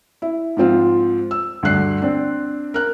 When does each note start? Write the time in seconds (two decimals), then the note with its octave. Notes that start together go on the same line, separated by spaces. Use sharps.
0.22 E4
0.57 G#2 F3 C4 F4
1.31 E6
1.63 D2 G2 D3 F#6 C7
2.02 C4 D4
2.74 A#4 F#6